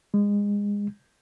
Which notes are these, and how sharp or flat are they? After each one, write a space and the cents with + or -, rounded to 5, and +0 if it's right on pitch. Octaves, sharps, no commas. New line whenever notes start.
G#3 -25